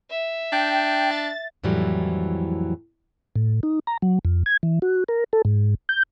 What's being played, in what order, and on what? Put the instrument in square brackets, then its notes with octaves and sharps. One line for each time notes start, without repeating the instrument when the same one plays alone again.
[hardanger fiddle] E5
[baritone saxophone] D4 [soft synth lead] G5
[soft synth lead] A6
[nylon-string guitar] F2 A2 E3 F#3 G3
[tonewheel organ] A2
D#4
A#5
F#3
F2
G#6
E3
F#4
A#4
A4
G#2
G6